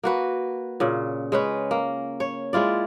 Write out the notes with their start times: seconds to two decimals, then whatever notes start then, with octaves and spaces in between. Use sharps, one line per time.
0.03 A#3 F#4 B4
0.80 A#2 C#3
1.32 G#3 C#4 B4
1.71 A#3
2.20 C#5
2.53 G#3 E4 F4 D5